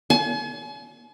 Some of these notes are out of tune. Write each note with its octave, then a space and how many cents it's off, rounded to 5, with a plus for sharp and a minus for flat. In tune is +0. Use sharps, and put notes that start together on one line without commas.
G#5 +45